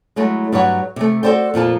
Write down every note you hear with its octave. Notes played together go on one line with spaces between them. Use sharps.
F#3 G#3 A3 E4
G2 F#3 B4 C#5 F#5
C3 A3
F#4 A4 A#4 C5 D5 G5
F2 A#2 F3 A5